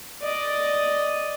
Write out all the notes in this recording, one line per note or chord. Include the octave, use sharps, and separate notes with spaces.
D5 D#5